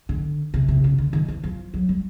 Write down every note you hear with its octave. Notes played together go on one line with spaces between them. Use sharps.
D3
C3
C3
C#3
D3
D#3
E3
F3
F#3
G3